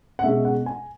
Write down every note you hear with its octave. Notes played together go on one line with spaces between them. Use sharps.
F#5
B2 G#3 C#4 E5
F#5
G#5